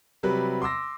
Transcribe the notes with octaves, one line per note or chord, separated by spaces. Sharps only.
C3 F#3 G3 B4
C6 D6 E6 A#6